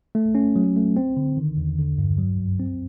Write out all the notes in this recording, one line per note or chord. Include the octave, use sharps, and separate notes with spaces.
A3
C#4
F#3
A3
C4
D3
D#3
E2
D3
G2
F#3
F#2
C4